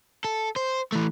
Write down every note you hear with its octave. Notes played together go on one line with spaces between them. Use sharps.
A4
C5
E3 A3